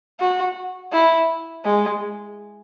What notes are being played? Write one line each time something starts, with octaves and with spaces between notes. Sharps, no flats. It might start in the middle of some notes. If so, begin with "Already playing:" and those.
F#4
E4
G#3